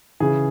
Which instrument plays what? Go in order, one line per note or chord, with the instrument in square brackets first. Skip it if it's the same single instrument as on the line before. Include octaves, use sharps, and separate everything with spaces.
[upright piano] C#3 E3 G#4